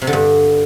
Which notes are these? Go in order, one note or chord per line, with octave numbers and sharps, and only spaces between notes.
C3
D3
G2